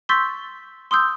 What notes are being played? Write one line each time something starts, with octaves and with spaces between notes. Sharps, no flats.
C6 C#6 E6 G6 A6 B6
C6 D#6 E6 G6